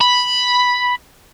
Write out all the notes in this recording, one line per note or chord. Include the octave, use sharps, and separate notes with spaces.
B5